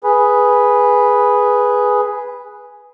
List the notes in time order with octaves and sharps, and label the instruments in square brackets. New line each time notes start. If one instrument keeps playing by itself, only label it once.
[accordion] G#4 B4